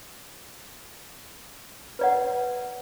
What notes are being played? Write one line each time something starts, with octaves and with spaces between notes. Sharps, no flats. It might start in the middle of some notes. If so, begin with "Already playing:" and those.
B4 D5 F#5